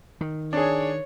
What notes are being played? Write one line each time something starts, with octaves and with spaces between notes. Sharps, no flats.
D#3
D4 G#4 C#5